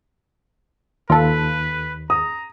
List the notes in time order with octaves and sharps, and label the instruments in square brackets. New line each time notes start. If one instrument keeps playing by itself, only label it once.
[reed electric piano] D#2 [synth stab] F4 A4 [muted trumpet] B4
[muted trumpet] A#5 [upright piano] D#6